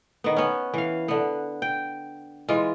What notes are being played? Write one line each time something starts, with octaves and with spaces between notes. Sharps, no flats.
D#3 B3
B3 C#4
E3 F5
D3 B3
G5
E3 G#3 F4